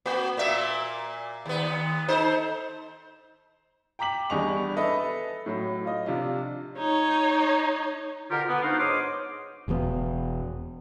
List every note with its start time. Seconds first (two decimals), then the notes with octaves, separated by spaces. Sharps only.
0.06 A#3 F#4
0.37 A#2 A#3 E5
1.46 D#2 B3
2.08 D#4 A4 C5
3.99 G5 A#5 D6 B6 F#7
4.30 E2 G3 D4 D#5 C#6 F7
4.77 A4 B4 D#5 E5
5.46 A2 F#3
5.85 F4 D#5
6.06 C3 F3 D4 F4
6.78 D#4 C#5
8.31 B2 D3 F4 G4 A#4
8.48 B3
8.63 B3 D4 D#4 F4 F#4 C5
8.79 G#2 C#5 C6 D6 D#6 F6
9.68 E1 E2 B2 B3